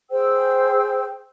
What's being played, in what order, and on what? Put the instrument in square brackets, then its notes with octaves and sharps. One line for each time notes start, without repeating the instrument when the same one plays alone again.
[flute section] G#4 C5 G5 E6